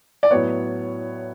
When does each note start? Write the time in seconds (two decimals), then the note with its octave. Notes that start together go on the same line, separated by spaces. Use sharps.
0.23 D5
0.31 A2 F#3 B3 C#5